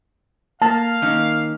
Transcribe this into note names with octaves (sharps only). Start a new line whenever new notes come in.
A#3 F5 A5
D#3 A#3 C#4